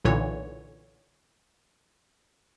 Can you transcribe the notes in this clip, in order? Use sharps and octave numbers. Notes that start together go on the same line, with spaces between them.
B1 A#2 D3 E3 C#5